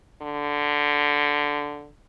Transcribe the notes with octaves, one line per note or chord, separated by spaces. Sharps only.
D3